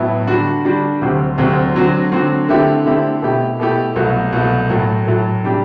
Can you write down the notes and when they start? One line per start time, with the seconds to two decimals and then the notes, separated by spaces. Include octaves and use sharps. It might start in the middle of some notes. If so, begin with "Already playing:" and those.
Already playing: A2 F#3 B3 E4
0.27 D3 G3 D4 F#4
0.64 D3 G3 D4 F#4
1.01 D2 C3 F#3 C4 G4
1.38 D2 C3 F#3 C4 G4
1.75 D3 F#3 C4 F#4
2.12 D3 F#3 C4 F#4
2.49 D3 A3 C4 E4 G4
2.85 D3 A3 C4 E4 G4
3.22 B2 A3 E4 G4
3.59 B2 A3 E4 G4
3.96 C2 B2 F#3 A3
4.33 C2 B2 F#3 A3
4.69 A2 F#3 A3
5.07 A2 F#3 A3
5.43 C3 G3 D4 G4